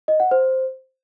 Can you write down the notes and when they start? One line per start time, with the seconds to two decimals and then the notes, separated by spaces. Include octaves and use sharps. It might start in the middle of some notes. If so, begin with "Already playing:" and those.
0.08 D#5
0.20 F#5
0.31 C5